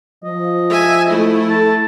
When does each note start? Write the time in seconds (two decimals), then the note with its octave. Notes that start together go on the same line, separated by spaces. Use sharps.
0.24 F3 D#5
0.70 E5 G#5
1.09 A3 E4
1.50 A4 A5